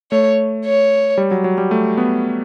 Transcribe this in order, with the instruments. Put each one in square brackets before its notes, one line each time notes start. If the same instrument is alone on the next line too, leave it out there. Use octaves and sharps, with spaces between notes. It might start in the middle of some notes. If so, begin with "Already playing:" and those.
[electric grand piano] A3 [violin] C#5
[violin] C#5
[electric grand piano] G3
F#3
F#3
G3
A3
B3